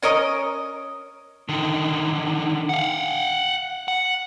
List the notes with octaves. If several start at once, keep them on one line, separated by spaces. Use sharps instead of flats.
C#4 A#4 C#5 D#5
D3 D#3
F5 F#5
F#5